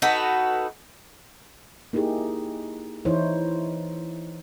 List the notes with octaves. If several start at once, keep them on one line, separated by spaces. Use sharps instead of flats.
D#4 F#4 A4 B4
A#3 D#4 E4 G4 G#4
E3 D#4 E4 C5 C#5